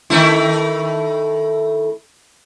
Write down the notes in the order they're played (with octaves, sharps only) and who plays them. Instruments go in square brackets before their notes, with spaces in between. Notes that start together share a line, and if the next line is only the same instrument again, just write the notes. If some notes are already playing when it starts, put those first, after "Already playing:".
[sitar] D#3 A3 E4